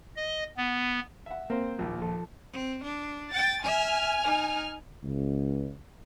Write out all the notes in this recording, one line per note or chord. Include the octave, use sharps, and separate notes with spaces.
D#5
B3
E5 F#5
A#3 C4 C5
A#1 D#2 A#2
F3 A4
C4
D4
G5 A6
E5 G#5 F6
D#4
C#2